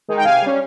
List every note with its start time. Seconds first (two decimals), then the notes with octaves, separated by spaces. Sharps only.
0.08 D#3 G#3 D#4
0.17 G5
0.25 C3 F5 G#5
0.41 G3 C#4